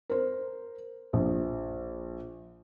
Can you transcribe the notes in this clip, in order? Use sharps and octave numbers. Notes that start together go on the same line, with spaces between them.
A#4 C5
A#1